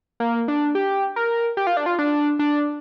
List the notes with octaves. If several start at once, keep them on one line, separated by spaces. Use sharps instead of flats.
A#3
D4
G4
A#4
G4
F4
D4
F4
D4
D4